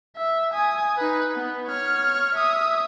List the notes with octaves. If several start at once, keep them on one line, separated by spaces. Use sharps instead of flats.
E5
G#5 D#6
D#4 B4
B3
C#5 F6
E5 D#6